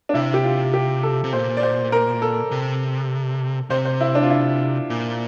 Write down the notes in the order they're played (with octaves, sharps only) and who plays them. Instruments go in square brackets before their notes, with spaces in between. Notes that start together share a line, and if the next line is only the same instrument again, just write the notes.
[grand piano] D4
[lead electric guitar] C3 [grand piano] E4
[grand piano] G4
F4
G4
A4
[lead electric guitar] C3
[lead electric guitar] A#2 [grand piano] C5
[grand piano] D5
C5
A#4
A4
[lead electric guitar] C3
[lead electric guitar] C3 [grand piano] C5
[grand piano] C5
E4
D4
F4
E4
[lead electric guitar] A#2